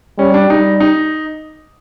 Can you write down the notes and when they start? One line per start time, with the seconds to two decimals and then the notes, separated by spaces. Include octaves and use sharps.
0.18 G3 C#4
0.34 D4
0.49 G3 D#4
0.80 D#4